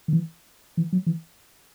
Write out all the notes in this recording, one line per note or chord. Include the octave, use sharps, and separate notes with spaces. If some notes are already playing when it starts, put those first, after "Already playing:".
D#3
E3
E3
F#3
E3